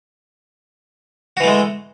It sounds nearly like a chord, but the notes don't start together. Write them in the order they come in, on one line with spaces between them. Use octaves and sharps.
F#4 E3 A3 G#3